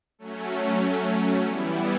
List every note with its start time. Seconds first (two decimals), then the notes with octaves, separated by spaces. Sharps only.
0.19 F#3 A3 C#4
1.43 E3 G3 B3 E4